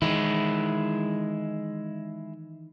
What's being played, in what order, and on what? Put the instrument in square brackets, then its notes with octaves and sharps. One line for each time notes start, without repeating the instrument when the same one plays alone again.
[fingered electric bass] D#3 E3 [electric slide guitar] G#3 E4